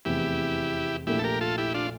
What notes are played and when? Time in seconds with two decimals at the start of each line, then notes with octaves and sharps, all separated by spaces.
0.05 F1 E2 C3 E4 G4
1.07 A#1 A#2 A3 E4 G4
1.19 A4
1.24 G4 A#4
1.41 F4 A4
1.58 E4 G4
1.74 D4 F4